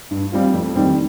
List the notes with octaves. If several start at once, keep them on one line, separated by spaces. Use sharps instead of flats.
G2
G3 C4 F4
F2
D#3 G3 C4